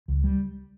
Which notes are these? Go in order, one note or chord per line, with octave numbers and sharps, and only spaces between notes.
C#2
G3